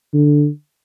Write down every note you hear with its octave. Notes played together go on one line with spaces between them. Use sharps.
D3